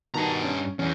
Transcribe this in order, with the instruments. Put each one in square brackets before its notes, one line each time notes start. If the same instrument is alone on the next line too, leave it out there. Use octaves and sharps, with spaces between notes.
[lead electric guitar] G2 A#5 [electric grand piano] B2 D#3 A5
[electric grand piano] C#4
[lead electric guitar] E2 [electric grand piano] C#4